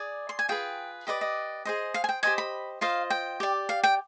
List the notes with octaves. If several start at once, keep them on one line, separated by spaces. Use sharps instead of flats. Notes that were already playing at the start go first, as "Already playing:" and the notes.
Already playing: G#4 D5
C6
G#5
F4 G#4 B4 G5
G4 B4 D5 D#5
D#5
G#4 C5 D#5
F5
G#5
G5
G4 C5 D#5 G#5
B5
F4 C5 D#5 F5
G5
G4 D5
F5
G5